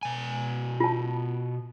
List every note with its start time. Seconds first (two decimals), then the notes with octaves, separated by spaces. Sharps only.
0.03 B2 G#5
0.80 F4 A5